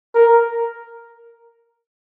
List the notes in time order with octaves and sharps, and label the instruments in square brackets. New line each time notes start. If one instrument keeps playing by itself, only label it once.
[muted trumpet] A#4